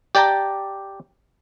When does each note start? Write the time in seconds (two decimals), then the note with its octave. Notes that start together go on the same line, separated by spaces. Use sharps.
0.15 G4 D5 G5 A5 A#5